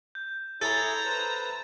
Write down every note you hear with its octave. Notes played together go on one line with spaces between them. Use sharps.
G6
E4 G#4 A4 C#5 A#5 A6
B4 C5 A5